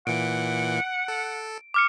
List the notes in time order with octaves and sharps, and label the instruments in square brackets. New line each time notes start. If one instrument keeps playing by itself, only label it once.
[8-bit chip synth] A#2 E3 [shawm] F#5 [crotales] D7
[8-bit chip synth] A4
[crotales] D6 F6 C#7